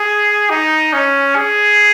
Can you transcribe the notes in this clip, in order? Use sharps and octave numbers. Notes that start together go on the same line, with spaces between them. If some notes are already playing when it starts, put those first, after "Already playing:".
Already playing: G#4
D#4
C#4
G#4